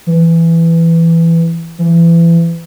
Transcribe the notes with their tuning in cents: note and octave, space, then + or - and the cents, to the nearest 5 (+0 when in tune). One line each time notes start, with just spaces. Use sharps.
E3 +10
E3 +30